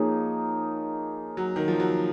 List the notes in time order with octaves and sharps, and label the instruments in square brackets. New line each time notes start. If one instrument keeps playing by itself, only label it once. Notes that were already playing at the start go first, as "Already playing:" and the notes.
Already playing: [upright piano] F3 [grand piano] A#3 D#4 G#4 C#5
[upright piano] F#3
D#3
F3
F#3